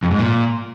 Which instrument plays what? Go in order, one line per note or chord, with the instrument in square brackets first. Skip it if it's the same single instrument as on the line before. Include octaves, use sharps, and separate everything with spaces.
[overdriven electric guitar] F2
G#2
A#2